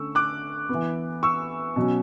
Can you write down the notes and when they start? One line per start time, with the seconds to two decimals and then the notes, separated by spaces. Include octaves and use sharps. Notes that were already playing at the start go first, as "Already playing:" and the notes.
Already playing: D3 A3 C#4 C#6 E6
0.15 D6 F#6
0.69 B3
0.74 E3
1.23 C#6 E6
1.76 B2 F#3 C#4